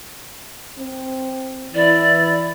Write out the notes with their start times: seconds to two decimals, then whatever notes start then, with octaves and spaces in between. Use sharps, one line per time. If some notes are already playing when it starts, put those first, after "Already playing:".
0.79 C4
1.74 E3 E4 D5